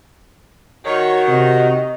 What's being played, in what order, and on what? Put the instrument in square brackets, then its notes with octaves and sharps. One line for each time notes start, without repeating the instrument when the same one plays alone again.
[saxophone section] D#3 [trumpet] F#4 [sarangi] C#5
[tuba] C3 [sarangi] D#5